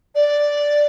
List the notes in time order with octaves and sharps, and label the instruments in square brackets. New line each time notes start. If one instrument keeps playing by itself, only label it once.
[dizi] D5